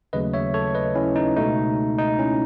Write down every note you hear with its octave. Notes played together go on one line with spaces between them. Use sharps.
D#2 C#3 F#3 A3 B4 D#5
C#5 E5
A4 C#5
B4 D#5
C#4 E4
D#4
C#2 B2 A3 D#4
D#4
C#4 E4